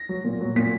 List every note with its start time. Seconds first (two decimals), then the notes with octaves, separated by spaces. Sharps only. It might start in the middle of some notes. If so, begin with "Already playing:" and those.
Already playing: A#6
0.09 F#3
0.25 A#2
0.41 F#3
0.56 A#2 B6